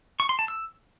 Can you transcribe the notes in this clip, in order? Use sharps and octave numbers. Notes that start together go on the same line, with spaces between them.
C#6
C6
A5
E6